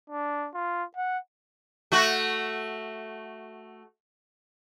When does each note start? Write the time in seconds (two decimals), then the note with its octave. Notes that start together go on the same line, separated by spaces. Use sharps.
0.10 D4
0.54 F4
0.97 F#5
1.92 A3 F#4